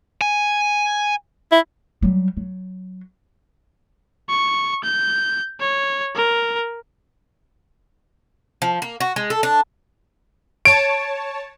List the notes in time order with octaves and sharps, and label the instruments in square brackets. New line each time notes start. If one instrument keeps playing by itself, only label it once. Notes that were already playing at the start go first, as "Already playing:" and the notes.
[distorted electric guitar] G#5
[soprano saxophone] E4
[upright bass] F#3 G3
F#3
[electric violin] C#6
G6
C#5
A#4
[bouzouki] F3
A#3
F#4
G#3
A4
D4
[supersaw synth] C#5 A5 [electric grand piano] D7